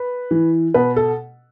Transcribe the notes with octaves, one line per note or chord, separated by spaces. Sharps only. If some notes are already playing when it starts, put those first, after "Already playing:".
Already playing: B4
E3
B2 B4
A4